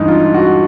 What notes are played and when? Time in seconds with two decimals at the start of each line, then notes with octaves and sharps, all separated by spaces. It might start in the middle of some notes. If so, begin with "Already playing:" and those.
Already playing: G2 E3 G#3 D#4
0.08 F4
0.34 F#4